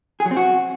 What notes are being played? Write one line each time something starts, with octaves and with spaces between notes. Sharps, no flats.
G#4
F#3
C4
F#4